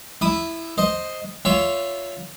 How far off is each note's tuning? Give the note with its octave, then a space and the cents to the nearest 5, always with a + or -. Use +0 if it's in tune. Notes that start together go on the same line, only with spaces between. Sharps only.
E4 +0 D#6 -25
C5 +0 D#5 +0
F4 +0 C#5 +20 E5 +0